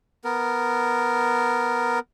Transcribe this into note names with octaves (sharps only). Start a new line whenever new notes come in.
B3 A#4